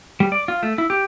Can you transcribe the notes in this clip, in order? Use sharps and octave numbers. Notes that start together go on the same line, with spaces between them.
G3
D5
F4
A3
E4
G4